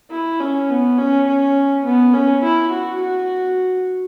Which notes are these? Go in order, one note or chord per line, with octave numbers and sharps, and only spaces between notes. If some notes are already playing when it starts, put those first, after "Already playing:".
E4
C#4
B3
C#4
C#4
B3
C#4
E4
F#4
F#4